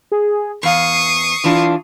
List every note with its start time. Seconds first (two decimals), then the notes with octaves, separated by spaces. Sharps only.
0.12 G#4
0.63 E2 F5 C#6 D#6 C7
1.44 E3 D4 F4